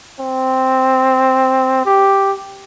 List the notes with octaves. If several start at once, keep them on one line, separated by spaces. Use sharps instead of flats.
C4
G4